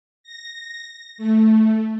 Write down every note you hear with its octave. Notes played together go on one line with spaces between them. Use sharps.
A#6
A3